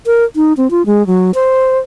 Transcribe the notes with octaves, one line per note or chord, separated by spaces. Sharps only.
A#4
D#4
C4
F4
G#3
F#3
C5